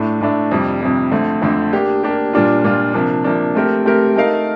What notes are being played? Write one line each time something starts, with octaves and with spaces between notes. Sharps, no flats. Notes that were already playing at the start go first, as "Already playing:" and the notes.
Already playing: A2 A3 D4
A2 A3 D4
F2 C3 G3
F2 C3 G3
F2 D3 A3 C4
F2 D3 A3 C4
A#3 D4 G4
A#3 D4 G4
A#2 G3 D4 F4
A#2 G3 D4 F4
C3 F3 A#3 D4
C3 F3 A#3 D4
A3 C4 G4 A#4
A3 C4 G4 A#4
A3 D#4 A#4 F5